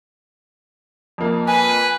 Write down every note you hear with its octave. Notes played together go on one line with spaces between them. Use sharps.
F2 A#3
B4 G#5